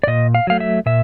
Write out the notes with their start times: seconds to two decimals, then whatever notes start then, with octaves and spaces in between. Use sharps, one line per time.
0.03 D5
0.07 A#2 D#5
0.35 F5
0.47 F#3 A3 F5
0.60 E5
0.86 A#2 E5